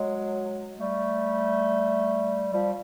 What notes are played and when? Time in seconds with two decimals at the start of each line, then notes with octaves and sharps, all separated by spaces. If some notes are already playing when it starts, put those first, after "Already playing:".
Already playing: F#3 G#3
0.78 G3 A3
2.52 F3 G3